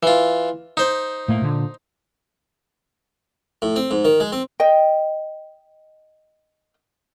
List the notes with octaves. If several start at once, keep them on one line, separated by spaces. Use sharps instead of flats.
E3 F4
D#4 C5
A2 A3 A#3
A#2 D3
A2
C4
G#2
D#3
G#3
C4
D#5 G5